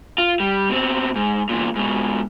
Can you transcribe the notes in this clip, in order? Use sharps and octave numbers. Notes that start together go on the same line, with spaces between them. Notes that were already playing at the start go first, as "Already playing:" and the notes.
F4
G3
B2 C4
G#2
E2 A#2
G#2 B2